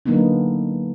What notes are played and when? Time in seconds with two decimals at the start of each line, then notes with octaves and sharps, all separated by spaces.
0.06 D3 F#3 A#3 B3 D4 D#4